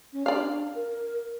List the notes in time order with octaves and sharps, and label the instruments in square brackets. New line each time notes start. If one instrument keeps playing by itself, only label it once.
[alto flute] C#4
[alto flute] D4 [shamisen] D5 F5
[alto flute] A#4